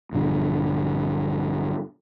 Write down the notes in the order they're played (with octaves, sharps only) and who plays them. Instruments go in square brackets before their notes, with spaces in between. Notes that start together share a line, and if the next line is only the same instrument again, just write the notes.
[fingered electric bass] A#1 G2 D3